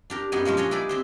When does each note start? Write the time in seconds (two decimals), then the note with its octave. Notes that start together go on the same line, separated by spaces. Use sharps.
0.10 D4 G4 A#4
0.32 F#2 B3 D#4 G4 G#5
0.45 A#2 F3 G#3 C#4
0.57 D4 G#4 C#5 D#5
0.71 E4 G4 G#4 B4 D5
0.89 C4 G4 C5